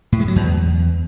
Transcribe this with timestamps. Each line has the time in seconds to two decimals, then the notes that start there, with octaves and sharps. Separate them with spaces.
0.12 A2
0.20 G#3
0.28 F#3
0.36 E2